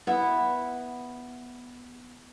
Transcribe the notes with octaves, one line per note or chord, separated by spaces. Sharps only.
B3 E4